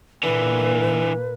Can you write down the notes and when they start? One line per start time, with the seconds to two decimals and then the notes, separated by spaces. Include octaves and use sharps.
0.23 A#2 D3 E3 A#3 B4